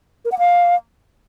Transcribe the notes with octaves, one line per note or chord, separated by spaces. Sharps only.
A#4
F#5
F5